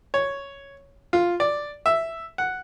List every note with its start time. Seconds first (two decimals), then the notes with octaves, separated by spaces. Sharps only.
0.14 C#5
1.13 F4
1.40 D5
1.86 E5
2.38 F#5